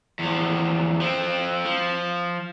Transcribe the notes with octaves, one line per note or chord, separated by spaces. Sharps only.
E2 F3
F3 C4
F3